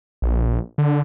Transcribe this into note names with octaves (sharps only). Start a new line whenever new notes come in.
A#1
D3